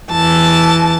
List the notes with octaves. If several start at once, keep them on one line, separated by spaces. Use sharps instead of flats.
E2 E3 A5